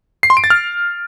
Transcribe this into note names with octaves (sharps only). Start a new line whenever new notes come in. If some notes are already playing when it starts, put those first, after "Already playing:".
C7
C6
D7
A6
F6